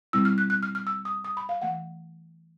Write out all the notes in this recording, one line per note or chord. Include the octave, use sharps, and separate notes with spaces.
B2 G3 C4 E4 E6
F6
F#6
F#6
F6
F6
E6
D#6
D#6
B5
F5
E3 A3 F#5